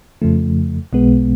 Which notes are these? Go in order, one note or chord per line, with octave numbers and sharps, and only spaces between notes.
F2 C#3 F3 A3
B1 B2 G#3 B3